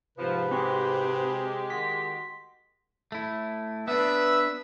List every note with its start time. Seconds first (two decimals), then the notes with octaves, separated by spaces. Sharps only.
0.18 G#2 C3 F3 B4
0.51 G#3 C4 F#4 G4 C6
1.70 D#3 F#4 C6 A#6 B6
3.12 A3 E4
3.88 B3 D4 B4 E5 E6